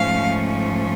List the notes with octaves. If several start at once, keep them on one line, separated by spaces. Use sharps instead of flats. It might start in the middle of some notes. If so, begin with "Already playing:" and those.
Already playing: G#2 F3 A3 C#4 F5